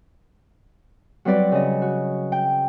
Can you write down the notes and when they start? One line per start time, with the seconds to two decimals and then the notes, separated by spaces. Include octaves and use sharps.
1.25 F#3 G3 C4 B4 D5
1.52 C#3 D#5
1.82 F#4
2.32 G5